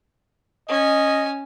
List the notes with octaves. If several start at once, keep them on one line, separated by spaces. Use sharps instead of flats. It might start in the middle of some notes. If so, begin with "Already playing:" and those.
C#4 D#5 G#5